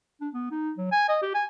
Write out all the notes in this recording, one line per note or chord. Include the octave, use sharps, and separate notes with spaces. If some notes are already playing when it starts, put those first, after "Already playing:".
D4
B3
D#4
F#3
G#5
D#5
G4
G#5